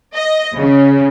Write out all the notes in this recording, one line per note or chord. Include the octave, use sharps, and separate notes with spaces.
D#5
C#3